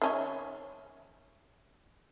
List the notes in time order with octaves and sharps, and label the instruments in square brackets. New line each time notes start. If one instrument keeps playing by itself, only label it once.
[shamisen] D#3 C#4 E5